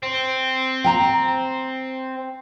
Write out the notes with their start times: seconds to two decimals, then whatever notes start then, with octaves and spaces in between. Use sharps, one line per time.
0.03 C4
0.84 G5 A#5